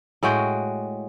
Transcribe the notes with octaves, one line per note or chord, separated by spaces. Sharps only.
A2 G#3 F#4 G5